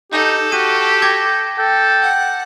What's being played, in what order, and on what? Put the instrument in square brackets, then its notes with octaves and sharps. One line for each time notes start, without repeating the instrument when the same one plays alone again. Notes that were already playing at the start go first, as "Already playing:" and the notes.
[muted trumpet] D#4 [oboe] G4 [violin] A4
[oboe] F#4 [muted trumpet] G4 [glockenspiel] D#7
[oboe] G5 [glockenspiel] D6 G#6 A#6
[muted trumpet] A4 [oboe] G5
[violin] F#5